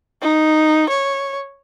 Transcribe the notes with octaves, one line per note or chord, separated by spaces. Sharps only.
D#4
C#5